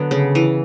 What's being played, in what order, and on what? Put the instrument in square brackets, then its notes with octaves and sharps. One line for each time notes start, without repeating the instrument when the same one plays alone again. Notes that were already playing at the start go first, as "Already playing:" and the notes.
Already playing: [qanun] D3 F#3 B3
C#3
E3